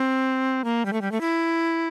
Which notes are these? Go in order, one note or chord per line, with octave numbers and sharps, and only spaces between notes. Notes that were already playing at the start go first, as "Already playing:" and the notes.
Already playing: C4
A#3
G3
A3
G3
A3
E4